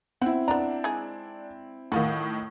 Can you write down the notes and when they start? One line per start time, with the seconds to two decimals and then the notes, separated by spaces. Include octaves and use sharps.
0.22 C4 E4 F#5
0.48 B3 D4 A#5
0.84 G#3 D#4 G#4
1.92 A2 D#3 F4 F#4